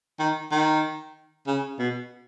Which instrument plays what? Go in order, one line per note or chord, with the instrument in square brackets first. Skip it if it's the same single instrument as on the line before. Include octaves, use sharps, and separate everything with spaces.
[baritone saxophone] D#3
D#3
C#3
B2